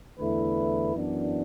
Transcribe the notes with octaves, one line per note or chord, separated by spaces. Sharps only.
E2 D3 A3 E4 B4
F#2 E3 B3 D4